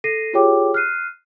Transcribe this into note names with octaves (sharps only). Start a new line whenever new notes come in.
A4 A#6 C7 D#7
F4 G4 G#4 C#5 G5 D6
F6 F#6 C7 D#7